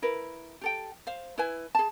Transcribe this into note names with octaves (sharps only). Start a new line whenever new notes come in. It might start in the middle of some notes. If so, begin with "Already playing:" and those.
E4 A#4 B4
G4 A4 G5
C5 F5
E4 B4 G#5
G#4 A5